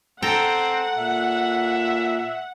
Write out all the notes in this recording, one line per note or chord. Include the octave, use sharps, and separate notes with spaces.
C4 A4 F#5 G5 A#5
A#2 E5